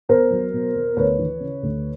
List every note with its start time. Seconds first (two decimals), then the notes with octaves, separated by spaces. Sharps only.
0.09 E2 A#4 C5
0.31 F#3
0.53 B2
0.75 E2
0.96 D2 B4 C#5
1.18 E3
1.40 C#3
1.63 D2